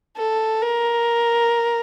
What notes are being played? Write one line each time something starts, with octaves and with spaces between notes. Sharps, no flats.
A4
A#4